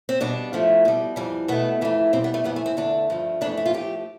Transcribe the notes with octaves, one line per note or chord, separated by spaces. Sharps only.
C4
B2 G3 D4
A2 F3 A3
B2 G3
F2 E3 G3
B2 A3 B3
F2 E3 A3
E2 B2 G3 C4
B3
A3
F2 E3 G3 B3
A3
C4
E2 D3 A3 D4
G2 F3 A3
F2 E3 A3 D4
E4
F4
A2 F3 A3 G4